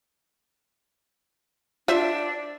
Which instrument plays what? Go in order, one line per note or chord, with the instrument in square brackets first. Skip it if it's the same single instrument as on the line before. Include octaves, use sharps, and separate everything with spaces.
[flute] D4 [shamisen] F4 C5 E5